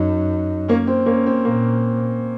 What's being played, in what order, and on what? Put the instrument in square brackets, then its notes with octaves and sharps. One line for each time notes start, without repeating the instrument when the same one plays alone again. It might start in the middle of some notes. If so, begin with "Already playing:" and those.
Already playing: [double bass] F#2 [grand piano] D#4
[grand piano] A#3 C#4
C4
A#3 C#4
C4
[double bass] A#2 [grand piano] A#3